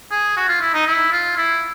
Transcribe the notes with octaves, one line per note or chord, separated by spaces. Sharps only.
G#4
F#4
F4
E4
D#4
E4
F4
E4